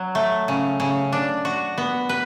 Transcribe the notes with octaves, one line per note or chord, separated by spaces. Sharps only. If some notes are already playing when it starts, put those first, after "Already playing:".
Already playing: F#3
A3
C#3
C#3
D4
F#4
B3
B4